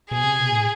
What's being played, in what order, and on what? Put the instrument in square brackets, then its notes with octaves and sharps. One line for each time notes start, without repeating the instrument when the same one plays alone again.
[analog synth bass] B2 [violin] G#4
[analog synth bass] C3
B2
A2